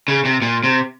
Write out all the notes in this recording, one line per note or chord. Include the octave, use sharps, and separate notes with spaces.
C#3
C3
A#2
C3